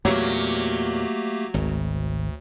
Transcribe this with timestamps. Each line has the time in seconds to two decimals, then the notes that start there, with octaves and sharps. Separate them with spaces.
0.05 E2 A#2 F#3 A3 A#3 G4
1.54 G#1 D2